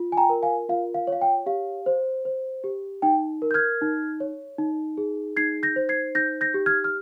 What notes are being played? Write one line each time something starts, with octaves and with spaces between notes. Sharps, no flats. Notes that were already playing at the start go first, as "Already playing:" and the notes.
Already playing: F4
G#5
G5 A#5
A#4
F5 G#5
F4 F5
F5
C#5
F5
G5
G4 F5
C5
C5
G4
D#4 G5
A#4
G6
F6 G#6
D#4
C#5
D#4
G#4
D#4 G#6 C7
G6 A#6
C5
G#6 C7
D#4 G6 A#6
G6 A#6
G4
F6 G#6
F6